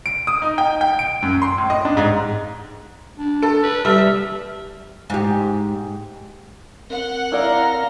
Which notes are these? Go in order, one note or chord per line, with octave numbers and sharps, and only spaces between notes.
D7
D#6
D#4
G5
G5
D7
F#2
C6
A2
D#5
D4
G#2
D4
A4
B4
G3 E5
G#2 G4
C4 A#4 F#5
E4 D5 F5 A#5